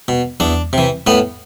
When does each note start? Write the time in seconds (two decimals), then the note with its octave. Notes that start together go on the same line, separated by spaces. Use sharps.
0.08 B2
0.40 E2 D4
0.73 C3 E3
1.07 A2 B3